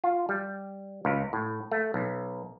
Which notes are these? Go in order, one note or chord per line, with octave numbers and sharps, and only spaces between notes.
F4
G3
C#2
A2
A3
B1